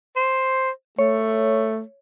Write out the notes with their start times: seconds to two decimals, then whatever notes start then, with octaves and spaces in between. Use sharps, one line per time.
0.16 C5
0.99 A3 C#5